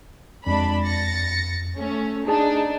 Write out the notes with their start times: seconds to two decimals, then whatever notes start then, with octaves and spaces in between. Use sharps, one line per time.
0.47 F2 G#3 D4 B5
0.85 A6 A#6 C#7
1.78 A3 C#4
2.28 D4 D#4 G#4 A5